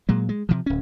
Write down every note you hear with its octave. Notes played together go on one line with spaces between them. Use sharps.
A#2 F#3 G#3
G#3
C3 D#3 F3
D1 C#4